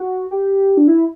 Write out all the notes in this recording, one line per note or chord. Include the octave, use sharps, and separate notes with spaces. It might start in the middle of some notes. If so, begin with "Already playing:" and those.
Already playing: F#4
G4
D4
E4